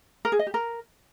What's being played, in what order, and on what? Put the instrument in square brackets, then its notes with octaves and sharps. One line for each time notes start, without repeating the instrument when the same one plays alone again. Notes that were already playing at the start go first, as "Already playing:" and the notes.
[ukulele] A#4
G#4
D#5
G4
A#4